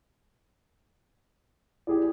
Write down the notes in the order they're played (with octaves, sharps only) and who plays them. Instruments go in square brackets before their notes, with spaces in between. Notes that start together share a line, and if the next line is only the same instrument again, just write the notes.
[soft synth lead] E4 [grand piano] G4 G#4 D5